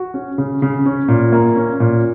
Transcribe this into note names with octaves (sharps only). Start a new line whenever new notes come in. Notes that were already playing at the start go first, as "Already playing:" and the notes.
Already playing: F#4
C#4
C#3
C#3
C#4
A#2
A#3
C#4
A#2